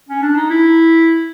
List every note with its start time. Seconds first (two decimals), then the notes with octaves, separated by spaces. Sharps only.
0.09 C#4
0.22 D4
0.36 D#4
0.50 E4